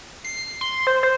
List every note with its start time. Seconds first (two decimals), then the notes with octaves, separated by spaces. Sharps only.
0.25 C7
0.61 C6
0.87 C5
1.03 C5